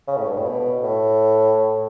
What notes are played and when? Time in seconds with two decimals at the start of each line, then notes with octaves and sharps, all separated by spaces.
0.07 C#3
0.17 A2
0.26 G2
0.36 A2
0.45 B2
0.83 A2